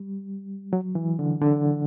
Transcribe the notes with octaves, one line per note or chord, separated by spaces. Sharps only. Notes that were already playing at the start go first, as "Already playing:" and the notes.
Already playing: G3
F#3
E3
D3
D3